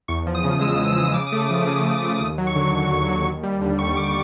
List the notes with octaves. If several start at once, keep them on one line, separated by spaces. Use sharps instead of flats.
E2 C#6
F3
D#6
C#3
G#3 E6
E2
E6
F3 D#6
C#3 D6
D#6
A3
F3
C#3
C#3
A3
D#2 D#6
F#3
C#6
D3
D#2
D#2
F#3
D#2
G3
D3
D#2 C#6
D#2 D6